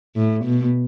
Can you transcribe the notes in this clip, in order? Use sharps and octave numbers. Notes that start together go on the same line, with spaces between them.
A2
B2